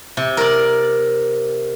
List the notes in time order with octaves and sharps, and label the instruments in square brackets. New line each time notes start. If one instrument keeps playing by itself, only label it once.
[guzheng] C3
A#4 D5